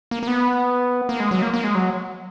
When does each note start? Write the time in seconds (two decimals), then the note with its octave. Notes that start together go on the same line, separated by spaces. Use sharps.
0.11 A#3
0.23 A#3
0.27 B3
1.09 A#3
1.20 G#3
1.31 F#3
1.42 A#3
1.54 A#3
1.64 G#3
1.75 F#3